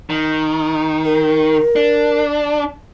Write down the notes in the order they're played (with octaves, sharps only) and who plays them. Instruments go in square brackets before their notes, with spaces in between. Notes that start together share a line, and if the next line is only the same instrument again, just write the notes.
[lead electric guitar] D#3
[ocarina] A#4
[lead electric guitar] D4